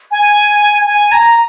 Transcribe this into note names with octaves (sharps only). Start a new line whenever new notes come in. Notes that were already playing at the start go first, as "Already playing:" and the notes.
G#5
G#5
A#5